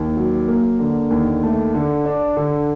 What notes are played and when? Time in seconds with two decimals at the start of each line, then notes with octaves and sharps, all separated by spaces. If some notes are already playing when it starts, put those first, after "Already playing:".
Already playing: D#2
0.17 F#3
0.48 A#3
0.79 D3
1.10 D#2
1.43 A3
1.74 D3
2.05 D4
2.37 D3